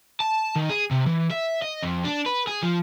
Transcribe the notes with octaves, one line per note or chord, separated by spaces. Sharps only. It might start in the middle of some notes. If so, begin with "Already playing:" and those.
A5
D#3
G#4
C3
E3
E5
D#5
F2
D4
B4
G#4
F3